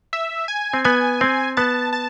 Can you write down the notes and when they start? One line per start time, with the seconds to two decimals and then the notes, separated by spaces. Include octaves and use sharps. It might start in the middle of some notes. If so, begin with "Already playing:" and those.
0.13 E5
0.48 G#5
0.74 C4
0.84 B3 G#5
1.21 C4
1.57 B3 A5
1.93 A5